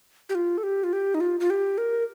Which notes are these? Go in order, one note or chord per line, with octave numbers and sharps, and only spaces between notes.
G4
F4
A4
G4
F4
G4
D#4
F4
F4
G4
A#4